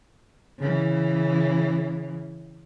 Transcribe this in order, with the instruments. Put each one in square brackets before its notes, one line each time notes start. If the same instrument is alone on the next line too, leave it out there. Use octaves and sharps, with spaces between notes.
[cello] C#3 E3